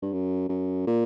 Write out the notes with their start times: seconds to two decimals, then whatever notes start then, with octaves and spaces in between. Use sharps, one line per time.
0.02 G2
0.13 F#2
0.49 F#2
0.87 A#2